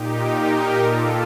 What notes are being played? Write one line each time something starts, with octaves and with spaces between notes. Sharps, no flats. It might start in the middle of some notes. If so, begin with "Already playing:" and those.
Already playing: A#2 D#4 G4
G4 A#4
A#2 F4 A4